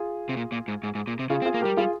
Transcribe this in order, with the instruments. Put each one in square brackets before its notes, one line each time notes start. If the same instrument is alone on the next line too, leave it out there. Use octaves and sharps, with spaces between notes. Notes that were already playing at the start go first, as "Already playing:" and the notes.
Already playing: [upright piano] F4 G#4
[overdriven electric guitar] C3
A#2
A#2
G#2
G#2
G#2
A#2
C3
[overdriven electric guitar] C#3 [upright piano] F4 G#4
[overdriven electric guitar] C4
[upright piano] F4 G#4
[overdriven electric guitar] A#3
[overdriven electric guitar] G3 [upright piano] G4 A#4
[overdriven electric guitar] G3 [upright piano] F4 G#4